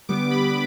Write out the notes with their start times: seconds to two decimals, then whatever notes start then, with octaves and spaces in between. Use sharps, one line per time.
0.09 D3 G3 B3 D6
0.31 B5